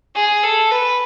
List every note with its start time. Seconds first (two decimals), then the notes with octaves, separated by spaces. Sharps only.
0.15 G#4
0.44 A4
0.71 B4